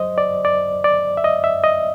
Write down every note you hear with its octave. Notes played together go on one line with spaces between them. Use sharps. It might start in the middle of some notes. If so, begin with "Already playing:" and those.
Already playing: F#3 C5 D#5
D5
D5
D5
E5
D#5
E5
D#5